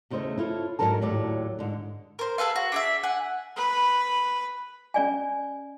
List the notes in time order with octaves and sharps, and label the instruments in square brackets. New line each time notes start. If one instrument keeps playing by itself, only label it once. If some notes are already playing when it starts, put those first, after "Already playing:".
[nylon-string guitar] E2 C#3 A3 C5 D#5 E5
E4 F4 A4 C#5
G#2 C#3 F#3 A4 A#4 A5
D#2 A2 F#3 D5
G#2 D3
[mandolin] A#4 C5
G#4 A4 B4 F5
F#4
D4 G#4 E5
F#5 G#5
[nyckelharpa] B4
[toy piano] C#4 D5 G#5